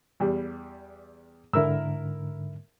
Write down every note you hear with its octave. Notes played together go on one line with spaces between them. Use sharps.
E2 G3
G#2 D3 E4 A#4 E6